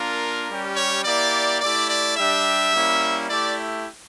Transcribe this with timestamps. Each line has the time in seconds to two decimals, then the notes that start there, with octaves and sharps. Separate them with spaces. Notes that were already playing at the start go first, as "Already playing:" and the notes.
Already playing: A#3 D4 F4 A#4
0.49 G3 C#4 G4
0.76 C#5
1.04 A#3 E4 G4 D5
1.60 A3 E4 G4 D5
1.90 D5
2.17 G3 D4 G4 E5
2.73 G3 A#3 C#4 E4
3.30 A3 E4 G4 D5